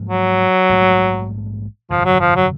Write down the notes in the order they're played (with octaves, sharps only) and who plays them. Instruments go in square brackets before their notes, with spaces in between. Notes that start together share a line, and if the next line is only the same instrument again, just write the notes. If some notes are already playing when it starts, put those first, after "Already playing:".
Already playing: [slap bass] G#2 F3 A#3
[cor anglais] F#3
[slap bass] A#1 G#2 F3 A3
[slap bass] G1 F2 C3 [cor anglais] F3
[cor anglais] F#3
F3
F#3